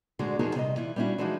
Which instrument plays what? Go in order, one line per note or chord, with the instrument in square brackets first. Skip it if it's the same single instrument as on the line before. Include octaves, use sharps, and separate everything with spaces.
[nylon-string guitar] D2 G#2 D3 G#3 F#4
E2 F3 D#4 F#4 G#4 A#4
C3 G3 D5 D#5
E3 E4 F4
G3 B3 C#4 D4 E4 F#4
E3 F3 G#3 D4 D#4 F#4